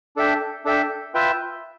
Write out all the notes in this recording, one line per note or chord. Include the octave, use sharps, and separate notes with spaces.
D4 A4 E5 G5
D4 A4 E5 G5
F4 B4 E5 G5